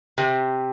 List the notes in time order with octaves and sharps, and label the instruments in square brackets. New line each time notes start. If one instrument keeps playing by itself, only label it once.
[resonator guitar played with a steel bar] C3